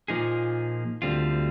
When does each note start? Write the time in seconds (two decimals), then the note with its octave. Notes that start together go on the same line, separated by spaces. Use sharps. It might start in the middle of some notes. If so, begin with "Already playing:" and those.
0.08 A#2 F3 A#3 D#4 G#4
1.02 D2 D3 G3 C4 F4